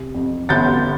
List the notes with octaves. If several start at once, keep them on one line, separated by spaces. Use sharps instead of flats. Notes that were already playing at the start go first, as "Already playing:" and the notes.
Already playing: C3
F2
G1 G6 A6